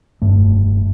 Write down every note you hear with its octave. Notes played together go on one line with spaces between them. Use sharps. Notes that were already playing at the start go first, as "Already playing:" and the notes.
F1 G2 A3